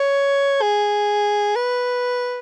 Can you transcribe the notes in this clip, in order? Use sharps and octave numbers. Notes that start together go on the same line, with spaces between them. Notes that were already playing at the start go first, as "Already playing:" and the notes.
Already playing: C#5
G#4
B4